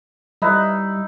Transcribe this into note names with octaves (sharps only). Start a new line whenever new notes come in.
G3 D#4 E4 B4